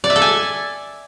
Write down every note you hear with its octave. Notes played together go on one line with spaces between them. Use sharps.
D5
E5
A4
G#5